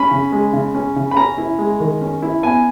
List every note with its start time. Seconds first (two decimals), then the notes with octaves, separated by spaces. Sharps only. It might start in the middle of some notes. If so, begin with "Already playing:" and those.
Already playing: C#4 B5
0.11 C#3
0.32 G#3
0.53 C#3
0.75 C#4
0.96 C#3
1.11 B5
1.17 C#4 A#5
1.38 E4
1.58 G#3
1.80 D#3
2.01 C#4
2.22 E4
2.43 B3 G#5